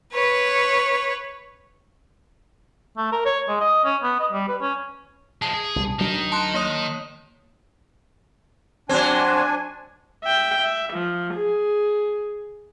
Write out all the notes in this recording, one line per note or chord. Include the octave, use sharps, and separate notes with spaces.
B4 C#5
A3
A#4
C#5
G#3
D#5
C#4
B3
D#5
G3
B4
C#4
F3 G#3 A5
G#4
C2 B2 G3
D2 D#3 F#3 D4 D#4
A5 C6 F#6
A#3 C#5 D#6
F#3 C4 D4 G#5
E5 G5
E5
F3
G#4